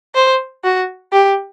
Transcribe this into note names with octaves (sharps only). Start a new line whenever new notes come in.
C5
F#4
G4